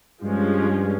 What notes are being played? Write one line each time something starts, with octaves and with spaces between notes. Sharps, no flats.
G2 F3 G#3 C#4